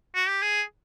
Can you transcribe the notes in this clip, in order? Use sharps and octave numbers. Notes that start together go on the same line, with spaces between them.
F#4
G4
G#4